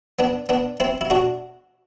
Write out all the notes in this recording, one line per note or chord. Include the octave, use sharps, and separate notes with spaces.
B3 D4
B3 D4
C4 E4
E4
D4 F#4